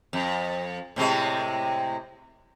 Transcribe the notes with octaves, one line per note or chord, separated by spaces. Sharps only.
F2
A2 C3 G#3